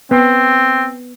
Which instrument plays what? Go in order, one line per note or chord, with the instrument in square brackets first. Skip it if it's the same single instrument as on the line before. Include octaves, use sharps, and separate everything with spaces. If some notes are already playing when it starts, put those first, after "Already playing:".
[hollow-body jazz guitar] B3 [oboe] C4